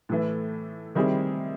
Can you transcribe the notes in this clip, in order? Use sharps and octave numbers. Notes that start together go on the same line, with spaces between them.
A2 E3 A3
D#3 G3 C4 E4 G#4